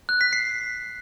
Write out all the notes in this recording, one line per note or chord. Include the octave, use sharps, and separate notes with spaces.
F#6
B6
C7